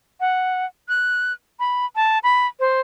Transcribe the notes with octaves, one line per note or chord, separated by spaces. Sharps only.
F#5
F#6
B5
A5
B5
C5